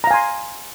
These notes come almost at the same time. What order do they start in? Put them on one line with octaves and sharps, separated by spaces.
A#5 F5 G#5 C6